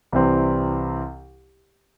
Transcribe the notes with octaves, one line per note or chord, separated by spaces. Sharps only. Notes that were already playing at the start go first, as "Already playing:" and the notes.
C2 C3 E3 C4